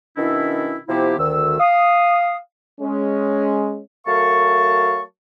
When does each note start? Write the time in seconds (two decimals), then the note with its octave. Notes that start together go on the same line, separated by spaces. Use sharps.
0.17 B2 D#3 C#4 D4 E4
0.88 C3 F3 B3 E4 G4
1.18 D2 D#3 E6
1.59 F5 D#6
2.81 G#3 C#4
4.06 F#3 A3 A#4 F5 A5 C#6